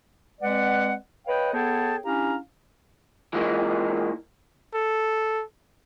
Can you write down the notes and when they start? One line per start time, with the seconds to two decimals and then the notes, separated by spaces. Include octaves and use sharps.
0.41 G#3 C4 B4 D5 F#5
1.26 B4 C#5 D#5 F5 G5
1.52 B3 G#4 A4 C#5 G5 A5
2.04 C#4 D4 E4 G4 F5 A#5
3.33 E3 F3 G#3 A#3
4.74 A4